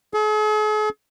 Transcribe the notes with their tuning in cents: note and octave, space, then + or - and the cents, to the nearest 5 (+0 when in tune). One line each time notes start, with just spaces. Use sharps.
G#4 +45